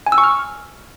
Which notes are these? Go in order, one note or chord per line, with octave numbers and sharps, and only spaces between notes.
G#5
E6
C#6
F6